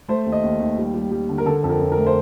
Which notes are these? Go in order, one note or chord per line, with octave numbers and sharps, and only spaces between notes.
A3 C5
D#2
D#5
D#2
D#2
G3
G3
G3
D3
A#4
D3 A4
F2 A4
A#4
F2
A#4
A3
C5